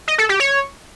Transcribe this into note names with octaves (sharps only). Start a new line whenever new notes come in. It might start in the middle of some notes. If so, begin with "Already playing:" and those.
D#5
A4
G4
C#5